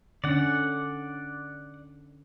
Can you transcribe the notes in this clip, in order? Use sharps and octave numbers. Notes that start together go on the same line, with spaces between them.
D3 C#4 D5 F#5